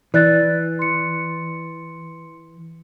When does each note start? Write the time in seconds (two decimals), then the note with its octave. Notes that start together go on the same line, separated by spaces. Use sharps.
0.14 E3 D5 F#6 A6
0.79 C6 C#7